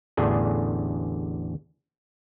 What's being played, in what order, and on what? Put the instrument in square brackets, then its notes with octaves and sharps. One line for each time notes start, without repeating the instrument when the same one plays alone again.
[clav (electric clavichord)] A1 E2 D3 D4 G#4